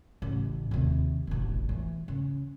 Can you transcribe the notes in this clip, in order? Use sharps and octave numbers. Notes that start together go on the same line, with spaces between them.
A1 C#3
D#2 C3
E1 A1
E3
C#3